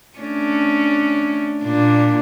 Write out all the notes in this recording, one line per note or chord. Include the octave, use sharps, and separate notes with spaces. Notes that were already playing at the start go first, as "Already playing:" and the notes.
A3 C#4 D4
A#2 D4